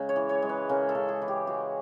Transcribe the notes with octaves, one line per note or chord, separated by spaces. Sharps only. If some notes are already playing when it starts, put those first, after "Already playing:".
Already playing: C#3 G#3
C#5
E3
C#5
G#3
B4
C#3 A#4
A4
C#3
G#4
E3
G4
G#3 F#4